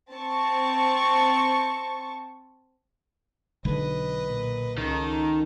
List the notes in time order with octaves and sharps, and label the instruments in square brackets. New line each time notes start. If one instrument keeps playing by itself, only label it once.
[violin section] C4 A5 C#6
[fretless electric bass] B1 D3 G#3 [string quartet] B4 D#5
[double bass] A#2
[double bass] C#2 [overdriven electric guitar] D#3 [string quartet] D#4 A4